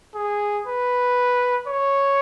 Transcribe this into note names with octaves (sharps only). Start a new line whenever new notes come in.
G#4
B4
C#5